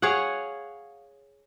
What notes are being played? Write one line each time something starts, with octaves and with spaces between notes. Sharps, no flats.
G#4 C#5 F5 F#5